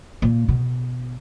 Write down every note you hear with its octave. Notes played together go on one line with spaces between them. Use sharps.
A#2
B2